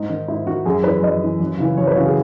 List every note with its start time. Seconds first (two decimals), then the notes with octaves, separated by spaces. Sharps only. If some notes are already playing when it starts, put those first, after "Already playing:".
Already playing: G#2 D#4
0.10 D#3
0.28 G#2 E4
0.46 D#3 F#4
0.66 F#2 G#4
0.84 E3 B4
1.03 F#2 D#5
1.21 E3
1.40 F#2
1.58 C#3 E3
1.77 F#2 C#5
1.87 B4
1.96 C#3 E3 F#4
2.05 G#4